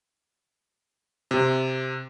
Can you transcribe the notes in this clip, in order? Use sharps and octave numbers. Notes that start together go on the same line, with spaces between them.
C3